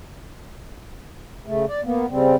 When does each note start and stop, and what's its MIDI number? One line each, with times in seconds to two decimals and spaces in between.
1.46 1.65 49
1.46 1.65 57
1.68 1.81 74
1.84 2.06 58
1.84 2.06 59
2.10 2.36 49
2.10 2.36 55
2.10 2.36 60